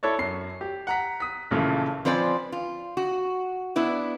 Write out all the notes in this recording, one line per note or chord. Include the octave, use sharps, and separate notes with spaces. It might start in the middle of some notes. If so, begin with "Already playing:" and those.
E4 A4 C#5 D5
F#2 C7
G4
F#5 A#5 B6
D#6 B6
A#1 A#2 C#3 E3 A3
F3 C4 B4 D5 G#5
F4
F#4
B3 D4 E4 B4